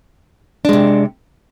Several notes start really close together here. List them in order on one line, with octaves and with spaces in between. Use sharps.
D4 G#3 C3